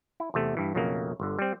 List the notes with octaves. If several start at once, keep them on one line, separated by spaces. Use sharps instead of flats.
E4
E2 C3 A3
G2 E3
B1 F2 C#3 F#3 A3 A#3
G1 D3
G3 C4